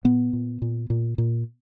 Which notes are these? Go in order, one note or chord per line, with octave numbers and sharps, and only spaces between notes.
A#2 B3
A#2
A#2
A#2
A#2